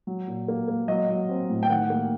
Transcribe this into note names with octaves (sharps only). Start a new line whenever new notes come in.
F#3
A#2
A#3
A#3
F#3 D#5
F#3
C4
A2
G5
D#3 F#5
A#3